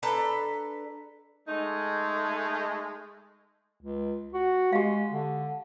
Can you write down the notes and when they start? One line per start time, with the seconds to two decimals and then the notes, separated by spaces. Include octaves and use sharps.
0.03 D4 A4 B4 A#5
1.48 G#3 A3 D#4
3.82 C#2
4.34 F#4
4.73 G#3 G4 F5
5.11 D3